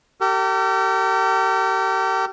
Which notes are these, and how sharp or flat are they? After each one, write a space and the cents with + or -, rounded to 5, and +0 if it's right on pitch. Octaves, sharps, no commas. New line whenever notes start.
G4 -30 A#4 -45